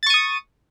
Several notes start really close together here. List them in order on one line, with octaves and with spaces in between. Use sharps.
A6 C#6 D#7 D#6